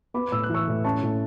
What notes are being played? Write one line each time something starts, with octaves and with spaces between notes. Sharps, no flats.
B3 B5 D6
A2 E6
F#6
E3
C#6 E6
A2
C#4 A5 C#6
A2